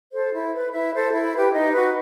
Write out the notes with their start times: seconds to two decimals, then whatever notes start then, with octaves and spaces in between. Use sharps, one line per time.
0.13 A4 C5
0.33 E4
0.53 B4
0.73 E4 E5
0.94 A4 C5
1.14 E4
1.34 G4 B4
1.53 D#4 D#5
1.73 F#4 B4